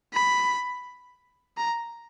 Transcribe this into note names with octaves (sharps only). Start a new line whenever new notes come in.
B5
A#5